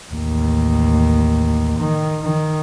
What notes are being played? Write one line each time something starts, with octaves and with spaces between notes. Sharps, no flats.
A1 D#2
D#3
D#3